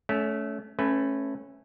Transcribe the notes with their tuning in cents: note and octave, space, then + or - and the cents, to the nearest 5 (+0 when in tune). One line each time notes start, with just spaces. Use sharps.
A3 -15 C#4 +20
A3 +0 C#4 -15 B4 +10